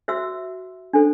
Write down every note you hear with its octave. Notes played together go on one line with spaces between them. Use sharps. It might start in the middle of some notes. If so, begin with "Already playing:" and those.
F#4 C5 E5 E6
D4 A4 C5